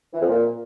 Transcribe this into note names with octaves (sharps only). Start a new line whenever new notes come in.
E3
F2
A#2